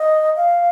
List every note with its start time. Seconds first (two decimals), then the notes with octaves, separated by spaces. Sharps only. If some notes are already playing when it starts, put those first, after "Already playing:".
Already playing: D#5
0.36 F5